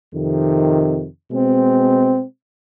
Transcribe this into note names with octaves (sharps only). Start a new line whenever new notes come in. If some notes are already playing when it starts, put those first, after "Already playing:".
F2 C3 D#3
B2 G#3 C4